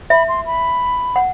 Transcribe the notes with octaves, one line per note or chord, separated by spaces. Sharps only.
E5 B5
C6
B5
F#5